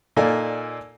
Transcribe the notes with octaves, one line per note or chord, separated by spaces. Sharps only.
A#2 A#3 D#4 A4 D5 G#5